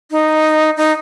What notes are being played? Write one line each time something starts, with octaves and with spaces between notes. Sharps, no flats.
D#4
D#4